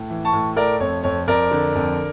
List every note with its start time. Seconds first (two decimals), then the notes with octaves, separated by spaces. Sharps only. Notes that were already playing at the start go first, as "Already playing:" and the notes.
Already playing: A2
0.10 E3
0.25 A5 C#6
0.33 A2
0.56 A3 A#4 D5
0.80 F2 C#5
1.03 F2 C#5
1.27 F2 A#4 D5
1.51 D3
1.75 F2